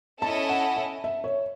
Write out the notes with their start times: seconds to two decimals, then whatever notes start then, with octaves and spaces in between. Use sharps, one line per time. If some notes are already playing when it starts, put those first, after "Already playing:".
0.22 C#4 E4 A4 D#5 A5
0.49 F#5
0.76 E5
1.04 E5
1.24 C#5